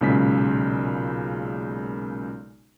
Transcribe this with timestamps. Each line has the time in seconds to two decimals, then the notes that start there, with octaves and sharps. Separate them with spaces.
0.01 B1 A#2 C#3 G#3 B6